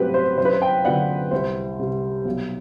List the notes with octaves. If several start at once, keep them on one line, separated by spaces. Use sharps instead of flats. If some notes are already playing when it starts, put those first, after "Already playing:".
Already playing: A1 G2 F#3 C4 G4 B4
C5
F#2 C5
B4
C5
G5
D3 F#3 B3 D4 F#5
C2 C5
C3 G3
B1